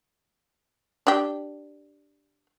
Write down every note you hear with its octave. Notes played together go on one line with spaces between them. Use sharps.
D4 G4